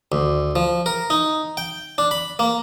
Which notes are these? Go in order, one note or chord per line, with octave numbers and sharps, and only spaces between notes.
D2
F3
A#4
D#4
G5
D4
B5
A#3